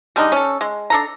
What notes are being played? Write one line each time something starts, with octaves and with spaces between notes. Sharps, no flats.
G3 G#3 D4 D#4
C#4 A4
G#3
D4 A4 A#5